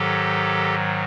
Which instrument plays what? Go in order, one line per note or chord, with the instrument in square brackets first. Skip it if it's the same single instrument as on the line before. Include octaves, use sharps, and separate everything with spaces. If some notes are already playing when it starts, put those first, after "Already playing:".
Already playing: [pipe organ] G#2 D#3 F#3 G4 A4